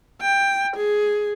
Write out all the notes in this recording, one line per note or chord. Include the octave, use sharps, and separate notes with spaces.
G5
G#4